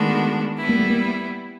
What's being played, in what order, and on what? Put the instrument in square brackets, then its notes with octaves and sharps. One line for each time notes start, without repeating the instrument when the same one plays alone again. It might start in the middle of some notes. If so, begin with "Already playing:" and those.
Already playing: [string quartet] D#3 G#3 B3 D4 F#4 [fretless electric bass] A3
[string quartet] G3 B3 E4
[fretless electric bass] A#3
A3
A#3